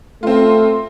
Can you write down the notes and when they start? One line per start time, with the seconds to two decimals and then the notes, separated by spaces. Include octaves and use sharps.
0.23 A3 C4 F4